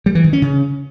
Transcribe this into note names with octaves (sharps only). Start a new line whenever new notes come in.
G3
E3
D#3
C#4
C#3